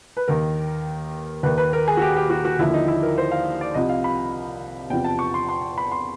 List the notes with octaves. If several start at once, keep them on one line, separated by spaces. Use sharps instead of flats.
B4
D#2 D#3 A#4
D#2 D#3 B4
B4
A#4
G#4
F#4
G4
G4
F#4
F#4
D#2 D3 F3 E4
D#4
E4
A#4
C5
F5
D5
C2 C3 F3 D#5
F5
B5
E2 C3 F3 G5
A5
C#6
C6
C6
B5
C6